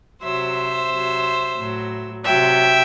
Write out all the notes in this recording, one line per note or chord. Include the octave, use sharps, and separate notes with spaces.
C3 F#3 C5 E5
C3 F#3
A2 F#3
C3 F#3 E5 G5